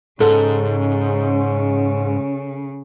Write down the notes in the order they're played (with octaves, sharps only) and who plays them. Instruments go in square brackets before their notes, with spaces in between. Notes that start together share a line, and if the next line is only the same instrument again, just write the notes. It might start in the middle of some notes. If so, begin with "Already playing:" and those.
[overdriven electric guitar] G#2 [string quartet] C#3 [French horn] C#4 [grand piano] A4